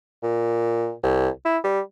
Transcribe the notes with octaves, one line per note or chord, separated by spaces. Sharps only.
A#2
C2
E4
G3